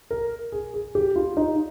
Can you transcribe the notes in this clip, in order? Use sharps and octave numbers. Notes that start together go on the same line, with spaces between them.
A#4
G#4
G#4
G4
F4
D#4